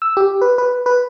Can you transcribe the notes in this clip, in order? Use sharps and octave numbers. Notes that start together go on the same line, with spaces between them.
E6
G4
B4
B4
B4